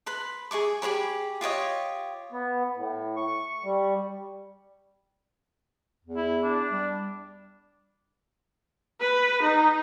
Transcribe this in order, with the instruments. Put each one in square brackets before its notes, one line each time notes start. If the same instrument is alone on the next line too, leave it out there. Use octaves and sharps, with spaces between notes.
[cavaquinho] B4 B5 C6
G#4 D5 C#6 D6
G4 G#4 C#5 B5
F4 G4 C#5 D#5
[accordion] B3
A2
C#6
G3
[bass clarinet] E2
[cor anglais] E4
D4
[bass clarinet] G3
[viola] B4
D#4